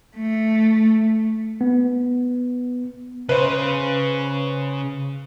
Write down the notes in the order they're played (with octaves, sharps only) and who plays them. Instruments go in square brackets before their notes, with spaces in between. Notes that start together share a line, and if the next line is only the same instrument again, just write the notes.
[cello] A3
[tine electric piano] B3
[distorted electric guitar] C#3 [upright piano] B4 C5